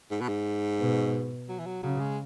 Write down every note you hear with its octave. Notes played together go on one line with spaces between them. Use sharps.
G#2
B2
G#2
B2
F#3
E3
F#3
C#3 F#3
G#3